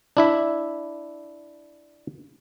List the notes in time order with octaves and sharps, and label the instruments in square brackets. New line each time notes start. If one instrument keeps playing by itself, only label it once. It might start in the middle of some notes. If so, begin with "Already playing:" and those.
[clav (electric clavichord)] D4 E4 E5